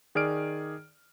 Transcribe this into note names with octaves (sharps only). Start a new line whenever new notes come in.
D#3 G#4 D5 F6 D7